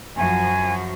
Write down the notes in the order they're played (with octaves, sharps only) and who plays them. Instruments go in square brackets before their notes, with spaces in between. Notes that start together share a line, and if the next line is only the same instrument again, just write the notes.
[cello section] F#2 F3 F#4 [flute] G#5